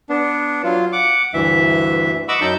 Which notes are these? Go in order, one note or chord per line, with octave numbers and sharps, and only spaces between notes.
B3 D4
F#3 F4
F#5 D6
D2 G2 E3 E5
D#5 F#5 B5 C#6 D6 E6
F#2 F#3 D#4 A5 E6 G6